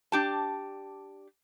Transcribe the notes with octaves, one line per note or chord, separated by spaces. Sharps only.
D4 G4 A5